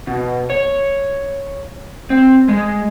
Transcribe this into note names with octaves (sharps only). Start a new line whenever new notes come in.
B2
C#5
C4
G#3